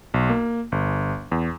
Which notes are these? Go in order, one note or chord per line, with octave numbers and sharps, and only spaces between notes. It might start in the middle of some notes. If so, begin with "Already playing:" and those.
B1
A#3
G1
E2